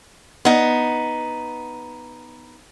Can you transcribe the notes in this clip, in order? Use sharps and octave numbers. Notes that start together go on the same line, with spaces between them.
B3 D#4